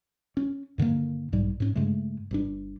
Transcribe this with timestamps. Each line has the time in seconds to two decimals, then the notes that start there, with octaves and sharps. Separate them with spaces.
0.37 C#4
0.78 G2 D3 D#3 A#3
1.32 B1 G#2 G3
1.60 G#2 C#4
1.75 G2 C#3 G#3 A3
2.31 G1 G2 D4